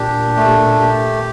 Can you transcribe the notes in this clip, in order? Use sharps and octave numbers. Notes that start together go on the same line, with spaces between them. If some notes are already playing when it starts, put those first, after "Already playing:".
Already playing: A#2 D4 G4
A3
G4